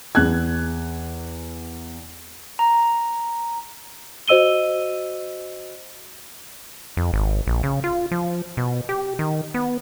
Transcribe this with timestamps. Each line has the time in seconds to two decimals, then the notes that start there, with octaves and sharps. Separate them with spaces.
0.15 E2 F#6 G#6
2.59 A#5
4.28 F#4 C5 D#5 E6 D#7 G7
6.97 F2
7.13 G#1
7.47 A#1
7.63 C#3
7.84 F4
8.11 F3
8.57 B2
8.89 G4
9.19 D#3
9.54 B3